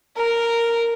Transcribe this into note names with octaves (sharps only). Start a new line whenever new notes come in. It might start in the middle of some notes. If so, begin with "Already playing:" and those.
A#4